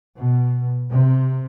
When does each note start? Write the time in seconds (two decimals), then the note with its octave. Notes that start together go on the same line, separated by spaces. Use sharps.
0.17 B2
0.89 C3